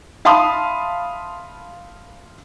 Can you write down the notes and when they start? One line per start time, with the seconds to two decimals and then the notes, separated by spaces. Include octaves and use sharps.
0.25 E5 F5 A5 B5 C6 D#6